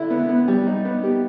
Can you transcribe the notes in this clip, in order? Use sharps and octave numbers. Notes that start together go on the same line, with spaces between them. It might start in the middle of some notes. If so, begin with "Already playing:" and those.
Already playing: D3 E4
B3
B3
G3
D#4
B3
G4